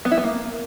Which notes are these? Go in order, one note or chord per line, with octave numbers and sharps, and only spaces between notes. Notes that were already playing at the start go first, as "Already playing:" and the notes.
B3
E4
B3
A#3